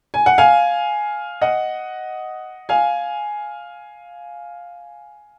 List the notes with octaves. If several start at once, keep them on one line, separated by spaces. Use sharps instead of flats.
G#5
F#5
F5 G#5
D#5 F#5
F5 G#5